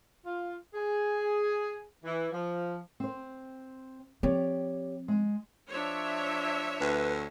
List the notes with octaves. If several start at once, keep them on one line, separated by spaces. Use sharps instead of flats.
F4
G#4
E3
F3
C4 C5
F3 C4 G4 C#5 D5
G#3
F3 D4 C#5 E5
D2 B4